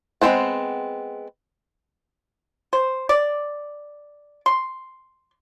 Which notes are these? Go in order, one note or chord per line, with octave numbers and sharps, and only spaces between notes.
G#3 B3 C4 C5 F#5
C5
D5
C6